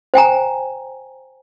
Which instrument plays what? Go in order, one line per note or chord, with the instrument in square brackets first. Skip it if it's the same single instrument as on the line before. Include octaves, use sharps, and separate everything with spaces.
[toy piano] C5 G5 G#5 A#5